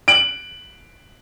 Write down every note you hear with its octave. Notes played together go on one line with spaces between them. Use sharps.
D7 F#7